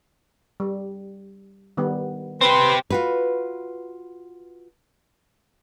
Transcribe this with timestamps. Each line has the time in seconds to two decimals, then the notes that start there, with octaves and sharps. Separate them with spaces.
0.60 G3
1.77 D#3 G3 B3
2.41 C4 G4 B4 C5 C6
2.90 F4 F#4 B4